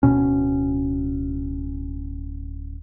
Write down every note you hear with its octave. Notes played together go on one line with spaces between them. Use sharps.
D1 C2 B2 C#4